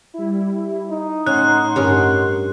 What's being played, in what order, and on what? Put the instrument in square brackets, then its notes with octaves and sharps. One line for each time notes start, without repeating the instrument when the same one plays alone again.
[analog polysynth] G3 E4
[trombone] D#4
[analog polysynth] A2 F#5 C6 [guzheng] C#4 [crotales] F#6
[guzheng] G2 C#4 A#4